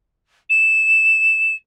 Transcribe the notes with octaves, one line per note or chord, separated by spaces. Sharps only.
E7